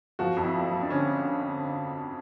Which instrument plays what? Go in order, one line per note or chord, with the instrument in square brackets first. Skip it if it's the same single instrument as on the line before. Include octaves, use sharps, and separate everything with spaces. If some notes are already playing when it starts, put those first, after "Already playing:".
[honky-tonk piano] F3 [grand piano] F#4
[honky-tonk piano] F2
[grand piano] E4
[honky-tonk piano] F3
F3
[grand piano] D4
[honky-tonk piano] D3 [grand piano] C#4